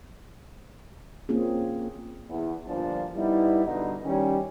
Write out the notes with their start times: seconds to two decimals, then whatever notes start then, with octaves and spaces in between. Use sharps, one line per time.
1.29 A#3 C4 C#4 F4 G#4
2.30 E2
2.67 G1 A#2 F3 D4 C5 A5
3.15 G3 B3 D#4 E4
3.66 G2 B2 D3 D#4
4.05 D#3 G3 C#4